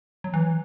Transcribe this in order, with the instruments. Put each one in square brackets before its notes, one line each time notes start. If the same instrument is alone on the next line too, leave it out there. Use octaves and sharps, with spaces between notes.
[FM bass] F#3
E3